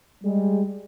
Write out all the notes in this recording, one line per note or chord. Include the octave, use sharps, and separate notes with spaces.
G3 G#3